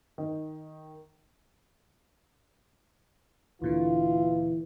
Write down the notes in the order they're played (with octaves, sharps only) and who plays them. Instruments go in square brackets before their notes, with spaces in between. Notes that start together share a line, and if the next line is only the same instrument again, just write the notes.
[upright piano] D#3
[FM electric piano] D2 A#2 D3 [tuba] E3 [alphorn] F4